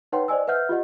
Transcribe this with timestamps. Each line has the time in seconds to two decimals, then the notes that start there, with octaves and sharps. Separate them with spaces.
0.12 D#4 B4 C#5 F#5 G5 C6
0.28 C5 D5 D#5 G#5 E6
0.47 B4 E5 F#5 F6 G6
0.69 F4 G4 D#5 F#5